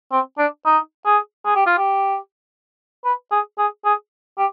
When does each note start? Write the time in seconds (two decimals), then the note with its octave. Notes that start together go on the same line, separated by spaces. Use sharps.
0.12 C4
0.38 D4
0.65 D#4
1.06 G#4
1.46 G#4
1.56 G4
1.66 F4
1.78 G4
3.05 B4
3.32 G#4
3.58 G#4
3.85 G#4
4.38 G4